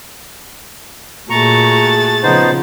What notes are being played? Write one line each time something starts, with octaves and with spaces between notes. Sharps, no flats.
A#2 A3 F#4 G#4 A#5 C#6 A6
C#3 F3 B3 D#4 C5